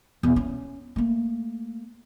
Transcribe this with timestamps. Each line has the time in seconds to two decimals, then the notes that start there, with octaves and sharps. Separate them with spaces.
0.23 E2 B2
0.36 C#4
0.96 A3 A#3